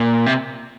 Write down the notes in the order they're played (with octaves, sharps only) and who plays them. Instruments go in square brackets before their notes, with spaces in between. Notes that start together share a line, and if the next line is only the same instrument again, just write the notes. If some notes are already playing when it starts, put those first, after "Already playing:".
Already playing: [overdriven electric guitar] A#2
C3